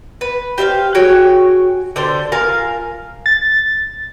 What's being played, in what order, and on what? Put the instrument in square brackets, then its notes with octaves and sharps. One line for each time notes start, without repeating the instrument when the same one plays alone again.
[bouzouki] B4
G4 C5 E5 F5
F#4 G#4 C#5 G5
D3 D4 G4 C5
F4 A#4 F5 G#5
[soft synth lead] A6